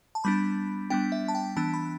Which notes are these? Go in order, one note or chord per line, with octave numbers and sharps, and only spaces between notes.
A5
G3 B3 D4 B5
G3 B3 D4 G5
E5
A5
G5
E3 B3 D4 A5
B5